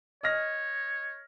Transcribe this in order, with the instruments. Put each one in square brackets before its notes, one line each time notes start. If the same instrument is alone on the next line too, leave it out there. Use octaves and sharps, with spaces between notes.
[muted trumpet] C#5 [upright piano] D#5 F6 A#6